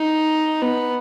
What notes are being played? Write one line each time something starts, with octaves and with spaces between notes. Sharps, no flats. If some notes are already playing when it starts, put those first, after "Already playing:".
Already playing: D#4
B3